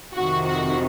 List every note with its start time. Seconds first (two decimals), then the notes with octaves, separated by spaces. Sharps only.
0.16 F2 C3 D#3 F#4
0.46 F#4